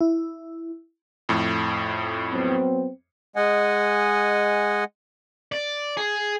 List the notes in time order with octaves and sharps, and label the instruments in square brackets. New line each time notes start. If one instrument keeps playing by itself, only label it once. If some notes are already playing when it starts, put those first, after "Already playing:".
[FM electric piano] E4
[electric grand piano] F2 A2
[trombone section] F#3 B3 C4
[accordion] G#3 D#5 F#5 G#5
[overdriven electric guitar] D5
G#4